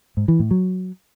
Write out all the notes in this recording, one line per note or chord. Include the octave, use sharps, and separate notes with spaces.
G#2
E3
A2
F#3